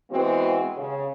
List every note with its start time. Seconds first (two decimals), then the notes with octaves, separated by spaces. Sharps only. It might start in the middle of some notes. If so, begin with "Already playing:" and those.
0.11 E3 G#3 B3 C4 F#4
0.77 C#3